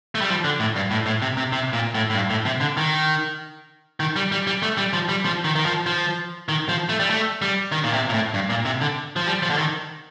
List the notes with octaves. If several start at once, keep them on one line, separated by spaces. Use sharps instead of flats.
A3
G3
F3
D3
A2
G2
A2
A2
C3
C3
C3
A#2
A2
A2
G2
A2
C3
D3
D#3
D#3
G3
G3
G3
A3
G3
F3
G3
F3
D#3
D#3
F3
F3
D#3
F3
A3
G3
A3
G3
D#3
A#2
C3
A#2
A2
G2
A#2
C3
D3
F3
G3
F3
D3
D#3